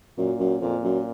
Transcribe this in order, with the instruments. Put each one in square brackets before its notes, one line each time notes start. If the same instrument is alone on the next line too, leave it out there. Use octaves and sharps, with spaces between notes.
[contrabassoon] F#2 [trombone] A#2
[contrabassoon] F#2
[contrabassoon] F2 [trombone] A#2
[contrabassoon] F#2